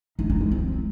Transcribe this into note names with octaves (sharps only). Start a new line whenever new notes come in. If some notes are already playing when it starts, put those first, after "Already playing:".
D#4
D#4
G#3
C4